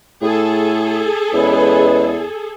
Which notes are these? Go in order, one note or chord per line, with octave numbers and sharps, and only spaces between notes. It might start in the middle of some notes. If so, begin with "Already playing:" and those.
A2 G#4 A4
E2 G#3 C#4 B4